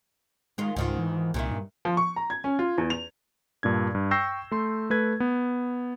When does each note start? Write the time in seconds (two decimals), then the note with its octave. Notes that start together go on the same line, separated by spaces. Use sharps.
0.58 D#3 G#3 F4
0.76 C#2 G#2 D#3 F4
0.99 E3
1.34 C2 A#2 D#3 E5
1.52 G2
1.85 F3
1.97 C#6
2.16 A#5
2.30 G#6
2.44 C#4
2.59 F4
2.78 E2
2.90 F7
3.63 G2 A#2 D4 G#6
3.95 G2
4.11 G5 C#6 E6 G6 A#6 C7
4.51 A3 C6
4.90 A3 B4 G#6
5.20 B3